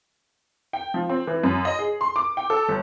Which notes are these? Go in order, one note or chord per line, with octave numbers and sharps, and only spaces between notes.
G5
F3
C4
E3
F#2
D#5
G#4
C6
D6
G5
A4
G1